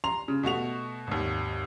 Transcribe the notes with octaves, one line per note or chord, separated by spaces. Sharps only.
A#5 C6 F7
C#3
B2 A3 F#4 F7
G#1 D#2